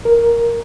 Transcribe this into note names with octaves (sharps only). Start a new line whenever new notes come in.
A#4